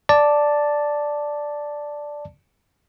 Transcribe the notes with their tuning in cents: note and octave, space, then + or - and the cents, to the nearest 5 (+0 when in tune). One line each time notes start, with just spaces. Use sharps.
D5 +0 A5 +0